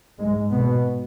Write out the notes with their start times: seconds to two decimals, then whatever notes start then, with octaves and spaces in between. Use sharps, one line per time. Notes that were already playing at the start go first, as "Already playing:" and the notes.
0.18 G#2 G#3
0.51 B2 B3